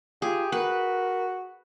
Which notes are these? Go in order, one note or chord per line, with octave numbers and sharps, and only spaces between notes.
F4 G4 G#4
F#4 A#4 B4